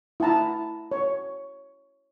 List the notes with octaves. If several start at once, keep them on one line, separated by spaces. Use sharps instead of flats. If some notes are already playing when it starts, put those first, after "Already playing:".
E4 F#5 A5 A#5
C#5